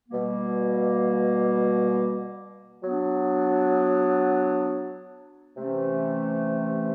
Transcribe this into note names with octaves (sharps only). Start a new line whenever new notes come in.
B2 G3 A#3
F#3 B3 D4
C3 E3 A3 C#4